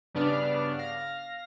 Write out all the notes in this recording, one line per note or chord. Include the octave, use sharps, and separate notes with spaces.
G2 C#3 B3 D4 D5 F6
F5 F6 A#6